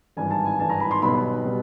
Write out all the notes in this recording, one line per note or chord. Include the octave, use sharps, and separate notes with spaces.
G#1 G2 E3 G#5
A5
G#5
G#1 G2 E3 A5
A#5
B5
C6
B1 B2 G3 B3 B5
B2 G3 B3